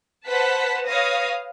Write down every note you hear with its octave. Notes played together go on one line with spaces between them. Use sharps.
B4 C5 F#5 A5 B6
B4 C#5 F5 D#6 A#6